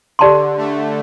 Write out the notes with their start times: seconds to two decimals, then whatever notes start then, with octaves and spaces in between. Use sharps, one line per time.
0.19 D3 G4 D5 A5 C6
0.57 A3